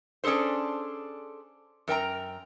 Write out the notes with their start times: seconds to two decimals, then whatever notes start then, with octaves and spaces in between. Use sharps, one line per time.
0.24 C#4 D4 G#4 A4 C5
1.88 F#2 A#4 G5 A#5